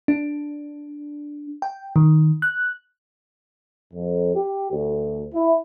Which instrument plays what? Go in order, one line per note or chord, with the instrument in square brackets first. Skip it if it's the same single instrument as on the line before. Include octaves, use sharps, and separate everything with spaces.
[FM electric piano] D4
G5
D#3
F#6
[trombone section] F2
G4
D2
E4